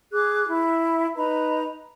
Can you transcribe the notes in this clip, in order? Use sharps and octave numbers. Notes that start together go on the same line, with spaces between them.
G#4 D6 F#6
E4
D#4 B4 A#5 B5